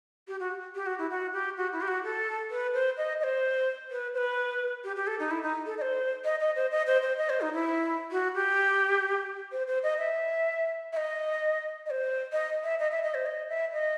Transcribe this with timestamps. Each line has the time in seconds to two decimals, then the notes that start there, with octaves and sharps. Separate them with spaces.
0.28 G4
0.40 F#4
0.75 G4
0.86 F#4
0.98 E4
1.10 F#4
1.33 G4
1.57 F#4
1.72 E4
1.81 G4
1.88 F#4
2.04 A4
2.51 B4
2.74 C5
2.97 D#5
3.20 D#5
3.24 C5
3.91 B4
4.14 C5
4.17 B4
4.84 G4
4.96 G4
5.07 A4
5.20 D#4
5.31 E4
5.43 D#4
5.66 A4
5.78 D#5
5.82 C5
6.25 D#5
6.40 D#5
6.56 C5
6.71 D#5
6.87 C5
7.02 C5
7.18 D#5
7.30 C5
7.41 D#4
7.53 E4
8.12 F#4
8.35 G4
9.52 C5
9.67 C5
9.83 D#5
9.98 E5
10.93 E5
10.97 D#5
11.86 D#5
11.90 C5
12.32 D#5
12.64 E5
12.79 D#5
12.91 E5
13.03 D#5
13.14 C5
13.26 D#5
13.49 E5
13.73 D#5